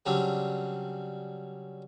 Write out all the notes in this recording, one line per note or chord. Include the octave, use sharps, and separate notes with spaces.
C#3 F#3 G3 C4 D4